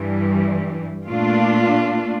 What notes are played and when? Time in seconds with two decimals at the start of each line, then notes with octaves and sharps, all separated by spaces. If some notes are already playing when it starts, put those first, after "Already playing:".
Already playing: G2 E3 G3
1.07 A#2 A3 D4 F4